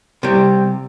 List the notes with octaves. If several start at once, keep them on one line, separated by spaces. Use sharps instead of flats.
C3 G3